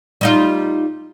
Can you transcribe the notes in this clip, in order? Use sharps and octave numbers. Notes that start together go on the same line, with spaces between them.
G3 D#4 F4